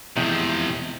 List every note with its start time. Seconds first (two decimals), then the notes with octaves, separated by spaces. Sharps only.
0.17 E2 C3 F3 G#3 G5